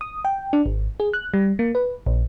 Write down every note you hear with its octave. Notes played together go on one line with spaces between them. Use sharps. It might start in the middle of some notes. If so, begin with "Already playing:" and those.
D#6
G5
D4
G#1
G#4
F#6
G3
A#3
B4
A#1